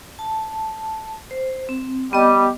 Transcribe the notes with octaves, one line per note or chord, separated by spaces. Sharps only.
A5
C5
C4
G3 B3 G4 D#5